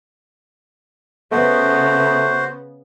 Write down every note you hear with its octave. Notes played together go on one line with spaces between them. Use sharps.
C#3 A3 B3 F#4 C5